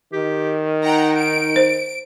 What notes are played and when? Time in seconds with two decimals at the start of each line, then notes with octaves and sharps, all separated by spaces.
0.13 D#3 G4
0.83 D#4 F#5 G5 A#5
1.17 D7
1.56 C5